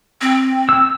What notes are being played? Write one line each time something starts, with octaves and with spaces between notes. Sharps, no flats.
C4
E6